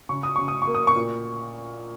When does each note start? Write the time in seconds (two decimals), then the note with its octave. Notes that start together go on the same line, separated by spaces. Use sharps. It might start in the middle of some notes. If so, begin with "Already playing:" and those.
0.09 C#3 C#6
0.23 D#6
0.36 C#3 C#6
0.48 D#6
0.62 C#6
0.67 A#3
0.75 D#6
0.87 C#6
0.95 A#2